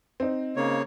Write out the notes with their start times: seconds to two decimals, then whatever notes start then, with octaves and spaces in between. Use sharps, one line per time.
0.20 C4 D#4
0.56 C#3 A#3 C#5